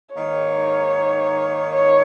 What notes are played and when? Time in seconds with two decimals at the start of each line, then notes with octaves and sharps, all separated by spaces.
0.16 G#2 D#3 A#3 C#5
1.73 C#5